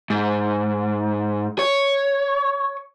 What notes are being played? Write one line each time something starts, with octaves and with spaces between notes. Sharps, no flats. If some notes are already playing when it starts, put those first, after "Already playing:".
G#2
C#5